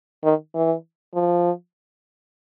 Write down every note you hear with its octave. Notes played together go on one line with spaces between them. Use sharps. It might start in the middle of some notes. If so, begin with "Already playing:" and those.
D#3
E3
F3